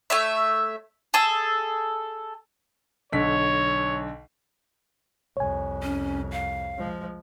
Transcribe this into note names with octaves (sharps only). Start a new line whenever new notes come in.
A3 C#5 E5
G#4 A4 E6
B1 D3 C#5 B6
C2 F2 C#5 G#5
C#4
F5
F3 G#3